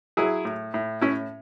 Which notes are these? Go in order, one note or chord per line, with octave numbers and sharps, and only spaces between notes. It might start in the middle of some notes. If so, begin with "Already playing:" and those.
F#3 E4 G#4
A2
A2
A2 C#4 E4